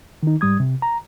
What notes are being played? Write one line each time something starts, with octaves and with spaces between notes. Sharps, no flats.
D#3 D#4
G#2 G3 D#6 G#6
C3
A#5